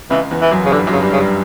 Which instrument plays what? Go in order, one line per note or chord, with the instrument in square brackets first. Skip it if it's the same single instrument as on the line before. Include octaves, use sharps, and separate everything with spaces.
[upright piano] C#2 C#3 [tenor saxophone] E3
[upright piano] E2 E3
[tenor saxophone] E3
[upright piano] F#2 F#3
[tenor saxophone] C#3
[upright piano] G2 G3 [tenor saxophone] D3
[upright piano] F#2 F#3
[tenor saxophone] C#3
[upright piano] G2 G3
[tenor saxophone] C#3
[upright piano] G2 G3